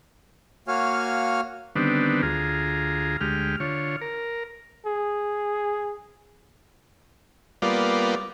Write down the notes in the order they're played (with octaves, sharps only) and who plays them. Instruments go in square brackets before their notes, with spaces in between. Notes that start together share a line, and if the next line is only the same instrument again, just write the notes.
[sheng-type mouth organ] A#3 F#4 C#5 F5 G#5 F6
[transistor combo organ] D3 D#3 G3 B3 C4 D4
D2 F4 G#4 A#5
D2 G#3 G4 F6
D3 F4 C#5
A#4
[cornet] G#4
[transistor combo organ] G3 A#3 B3 F4 D5